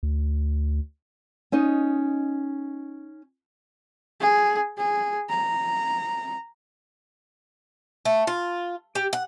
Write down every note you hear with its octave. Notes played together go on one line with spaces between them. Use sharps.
D2
C#4 D#4 D#5
G#4
G#4
A#5
A3
F4
G4
F#5